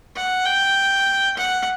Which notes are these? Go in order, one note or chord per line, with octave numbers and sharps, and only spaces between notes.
F#5
G5
F#5